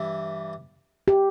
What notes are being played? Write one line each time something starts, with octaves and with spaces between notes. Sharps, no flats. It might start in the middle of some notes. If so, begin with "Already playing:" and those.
Already playing: G2 E3 E4
G4